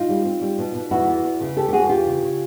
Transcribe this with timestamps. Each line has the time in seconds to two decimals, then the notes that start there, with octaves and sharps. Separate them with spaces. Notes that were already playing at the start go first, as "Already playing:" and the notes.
Already playing: D#4 F4
0.09 G3
0.25 C4
0.41 G3
0.58 B2
0.74 B2
0.91 E2 E4 F#4
1.08 E2
1.24 E2
1.41 C#3
1.57 E2 G4 A4
1.68 G4
1.73 E2 F#4 G#4
1.89 E2 F4 G4
2.06 C#3
2.23 C#3